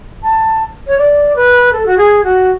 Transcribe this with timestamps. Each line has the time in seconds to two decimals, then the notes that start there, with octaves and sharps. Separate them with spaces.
0.23 A5
0.87 C#5
0.98 D5
1.36 B4
1.73 A4
1.86 F#4
1.98 G#4
2.24 F#4